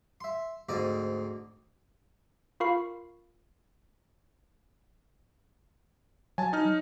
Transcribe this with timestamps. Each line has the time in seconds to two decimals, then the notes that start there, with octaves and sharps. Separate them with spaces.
0.21 E5 C6
0.69 D2 G#2 C4 D5 D#5
2.60 F4 A#4 F5 B5 C#6 C7
6.38 F#3 G#5 A5
6.53 D#4 F6